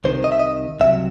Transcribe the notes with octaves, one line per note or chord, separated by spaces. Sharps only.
C2 C3 D#3 C5
D#5
E5
D#5
C2 C3 F#3 E5